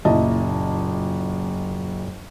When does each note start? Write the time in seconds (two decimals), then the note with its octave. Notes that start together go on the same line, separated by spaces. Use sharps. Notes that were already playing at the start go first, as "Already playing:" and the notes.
0.05 F#1 A#2 E4 D#5 A5